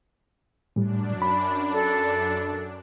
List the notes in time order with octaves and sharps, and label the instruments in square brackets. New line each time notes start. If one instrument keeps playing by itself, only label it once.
[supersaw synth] F#2 D4 [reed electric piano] A2 G3
[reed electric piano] B5
[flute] A4